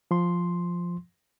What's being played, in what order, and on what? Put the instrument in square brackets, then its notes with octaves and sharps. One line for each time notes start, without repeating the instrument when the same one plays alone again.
[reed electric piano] F3 C6